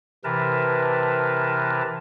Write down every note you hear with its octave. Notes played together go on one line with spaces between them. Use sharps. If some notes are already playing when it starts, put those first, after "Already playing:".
C3 E3 A#4 B4 A5